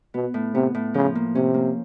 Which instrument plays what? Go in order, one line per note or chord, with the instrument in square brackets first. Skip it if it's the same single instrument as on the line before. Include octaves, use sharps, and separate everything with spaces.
[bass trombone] B2 [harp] B3
[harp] A2
[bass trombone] C3 [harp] B3
[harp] A2
[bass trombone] C#3 [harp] F3
[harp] A#3
[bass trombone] C3 [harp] C#4
[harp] A#3